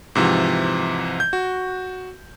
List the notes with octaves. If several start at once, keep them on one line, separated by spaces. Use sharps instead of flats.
G#2 C3 E3 F3
G6
F#4